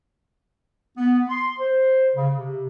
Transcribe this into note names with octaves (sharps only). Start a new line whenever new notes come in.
B3
C6
C5
C#3
C3